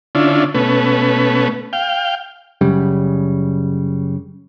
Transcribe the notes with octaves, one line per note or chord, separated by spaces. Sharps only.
D3 C#4 D4 E4 F4
B2 A3 C#4 B4
F5 G5
F#2 C#3 G3